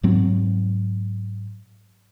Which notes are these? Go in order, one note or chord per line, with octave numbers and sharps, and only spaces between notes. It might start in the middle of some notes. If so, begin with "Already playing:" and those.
G#2 F#3 C4